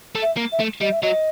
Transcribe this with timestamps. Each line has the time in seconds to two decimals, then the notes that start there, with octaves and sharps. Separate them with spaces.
0.15 A3
0.22 E5
0.37 A#3
0.52 E5
0.60 A3
0.81 G3 D#5
0.92 E5
1.03 F#3 D#5